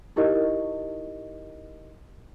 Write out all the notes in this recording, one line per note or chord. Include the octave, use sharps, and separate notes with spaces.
D#4 E4 G4 A#4 D#5